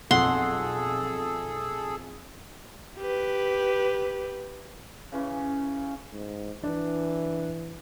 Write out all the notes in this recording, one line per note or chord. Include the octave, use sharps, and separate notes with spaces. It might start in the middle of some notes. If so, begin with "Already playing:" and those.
B1 F2 G#4 A4 F#5 C6
G4 B4
C#3 E3 C#4
G#2
E3 D4